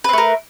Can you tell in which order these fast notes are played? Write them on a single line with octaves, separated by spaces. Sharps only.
B4 C4 A3 A#4